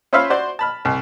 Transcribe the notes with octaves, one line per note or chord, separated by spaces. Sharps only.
C#4 F4 C5 E5 F5 B5
F#4 C5 D5
A5 B5 F6
C2